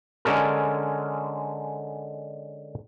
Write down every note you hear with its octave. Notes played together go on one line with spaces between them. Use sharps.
D3 G#3 C#4 A4 A#4